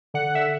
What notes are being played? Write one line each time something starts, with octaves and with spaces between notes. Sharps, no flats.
D3 F#5
E5